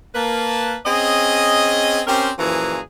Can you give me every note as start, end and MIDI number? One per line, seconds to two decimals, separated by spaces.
0.15 0.77 58
0.15 0.77 71
0.15 0.77 81
0.86 2.01 60
0.86 2.01 61
0.86 2.01 68
0.86 2.01 75
2.07 2.31 60
2.07 2.31 61
2.07 2.31 67
2.07 2.31 70
2.07 2.31 72
2.39 2.79 42
2.39 2.79 46
2.39 2.79 52
2.39 2.79 53
2.39 2.79 68
2.39 2.79 82